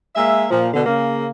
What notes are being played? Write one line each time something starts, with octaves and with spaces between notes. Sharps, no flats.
G#3 A#3 E5
A#2 F3
B2 D3
C#3 A#3